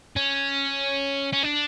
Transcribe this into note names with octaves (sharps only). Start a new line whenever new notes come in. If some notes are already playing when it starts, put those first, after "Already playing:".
C#4
C#4
D4